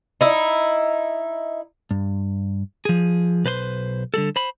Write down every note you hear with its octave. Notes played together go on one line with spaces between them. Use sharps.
D#4 E4
G2
F3 G#4
B1 B4 C5 C6
D3 G3 G#4 A4
C5 B5